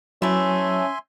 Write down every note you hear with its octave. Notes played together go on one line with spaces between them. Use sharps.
E3 F#3 A3 C#4 E5 G#5 C6